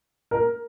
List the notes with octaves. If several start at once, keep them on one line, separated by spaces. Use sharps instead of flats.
A#4